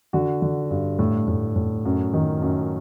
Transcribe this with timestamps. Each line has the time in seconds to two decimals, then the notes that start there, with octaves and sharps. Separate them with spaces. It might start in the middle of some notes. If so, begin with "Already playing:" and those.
0.13 D3 F#4
0.42 D3
0.70 G2
0.99 A2
1.28 A2
1.56 A2
1.85 F#2
2.13 D#3
2.42 F#2